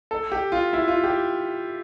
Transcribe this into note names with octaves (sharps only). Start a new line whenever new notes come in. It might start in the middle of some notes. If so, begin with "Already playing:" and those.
A4
G4
F4
E4
F4
G4